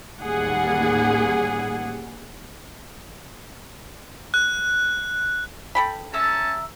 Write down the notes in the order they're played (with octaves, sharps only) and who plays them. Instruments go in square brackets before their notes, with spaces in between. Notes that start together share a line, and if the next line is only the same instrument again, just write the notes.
[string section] A1 D#2 G3 G#4 F#5
[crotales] F#6
[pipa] A4 G5 B5
[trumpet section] C#4 A5 [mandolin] E5 A#5 E6